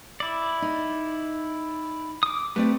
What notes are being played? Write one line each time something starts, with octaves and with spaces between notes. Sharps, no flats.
E4 D5
D#4
D6 D#6
A3 C4 G4 B4 D5